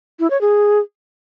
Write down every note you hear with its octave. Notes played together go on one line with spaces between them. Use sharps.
E4
C#5
G#4